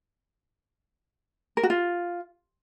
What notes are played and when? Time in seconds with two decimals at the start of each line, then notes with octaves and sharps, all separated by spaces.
1.57 A#4
1.63 F#4
1.70 F4